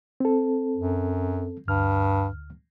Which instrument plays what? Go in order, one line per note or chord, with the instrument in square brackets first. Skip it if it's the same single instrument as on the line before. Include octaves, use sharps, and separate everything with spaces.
[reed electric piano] C4 A4
[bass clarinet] F#2
[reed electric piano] D2 F6 [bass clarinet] G2